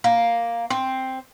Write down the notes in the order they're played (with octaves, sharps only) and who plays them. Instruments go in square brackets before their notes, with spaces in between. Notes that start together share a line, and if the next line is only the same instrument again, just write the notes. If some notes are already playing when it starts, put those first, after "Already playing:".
[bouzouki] A#3
C4